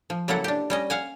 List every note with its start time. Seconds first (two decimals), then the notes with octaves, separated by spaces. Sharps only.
0.10 F3
0.28 C#3 F#3 A#3 E4 A4 F#5
0.44 D4 G4
0.70 G3 C#4 D#5
0.90 F5 F#5 G#5